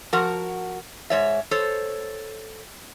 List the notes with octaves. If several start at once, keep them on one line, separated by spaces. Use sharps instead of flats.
F3 F#4 A#4 F#5
G#2 C#5 E5
A4 C5 C#5